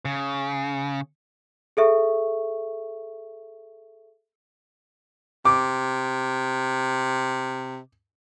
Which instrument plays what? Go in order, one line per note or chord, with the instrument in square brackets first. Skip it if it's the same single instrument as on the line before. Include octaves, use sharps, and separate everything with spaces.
[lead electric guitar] C#3
[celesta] G#4 A4 E5 C#6
[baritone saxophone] C3 [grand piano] D6